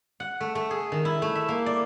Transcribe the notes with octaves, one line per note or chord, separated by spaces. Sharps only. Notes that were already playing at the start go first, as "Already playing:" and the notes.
F#5
A3
A3
G#4
D#3
E4
A3
E5
A#3
D5